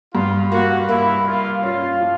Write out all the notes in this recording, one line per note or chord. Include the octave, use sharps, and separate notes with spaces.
G2 F4
A#3 F#4
A#3 E4
A#3 F4
C#4 F4
F3